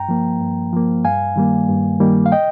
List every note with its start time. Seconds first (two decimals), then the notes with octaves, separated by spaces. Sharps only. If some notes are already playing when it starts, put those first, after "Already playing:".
Already playing: G2 G5 A#5
0.09 F3 A#3
0.41 G2
0.73 F3 A#3
1.04 G2 F5 G#5
1.36 D#3 G3 A#3
1.69 G2
2.00 D#3 G3 A#3
2.26 F5
2.32 D#5 G5